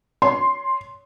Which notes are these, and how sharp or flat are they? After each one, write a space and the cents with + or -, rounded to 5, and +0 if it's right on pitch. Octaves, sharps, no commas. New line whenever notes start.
C#5 +20 C6 +0